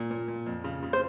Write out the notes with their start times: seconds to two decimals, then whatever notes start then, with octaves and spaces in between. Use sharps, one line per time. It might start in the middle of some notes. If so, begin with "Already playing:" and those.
Already playing: A#2
0.11 A#2
0.28 A#2
0.46 F2
0.64 C#3
0.83 C#3
0.93 C5